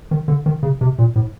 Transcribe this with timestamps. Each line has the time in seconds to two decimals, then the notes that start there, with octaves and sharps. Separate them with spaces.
0.11 D#3
0.28 D3
0.46 D#3
0.63 C#3
0.81 C3
0.99 A#2
1.16 A2